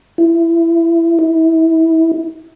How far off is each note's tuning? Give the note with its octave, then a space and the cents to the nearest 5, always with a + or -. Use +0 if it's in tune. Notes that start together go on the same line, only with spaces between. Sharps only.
E4 +20
E4 -25